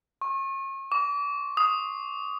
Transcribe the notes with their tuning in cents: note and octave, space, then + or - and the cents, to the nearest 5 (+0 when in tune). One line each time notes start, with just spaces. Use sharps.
C#6 -35
D6 -40
D#6 +5